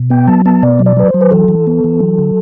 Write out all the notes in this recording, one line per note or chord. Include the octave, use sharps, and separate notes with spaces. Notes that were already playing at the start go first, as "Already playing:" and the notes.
Already playing: B2
B3 G5
F#3 A5
B3 A5
B2 D5
F#3
D5
F#3 B4
C5
F#3
B4
E3 A4
E3
B3
E3
F#3
D3